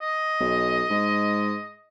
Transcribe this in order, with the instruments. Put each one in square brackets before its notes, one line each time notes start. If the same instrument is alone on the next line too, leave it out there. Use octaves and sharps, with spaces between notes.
[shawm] D#5
[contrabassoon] B1
G#2